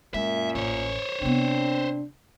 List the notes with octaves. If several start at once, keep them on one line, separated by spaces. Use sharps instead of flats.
F#2 A#2 G#3 E5
A1 C5 C#5
C3 B3 C4 D4